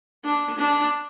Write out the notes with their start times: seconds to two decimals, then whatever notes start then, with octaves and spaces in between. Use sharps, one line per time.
0.25 D4
0.58 D4